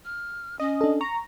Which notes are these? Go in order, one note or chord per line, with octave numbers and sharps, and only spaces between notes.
F6
C#4 D#5
D4 A4
A#5 C#6